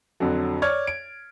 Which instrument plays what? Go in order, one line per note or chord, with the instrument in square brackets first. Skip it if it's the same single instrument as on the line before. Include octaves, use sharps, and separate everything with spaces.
[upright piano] F2 D3 F#3
C#5 D5 F6 G#6
D7